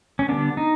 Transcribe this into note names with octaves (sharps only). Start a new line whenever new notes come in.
C#4
D3 G3 B3 D4
D#4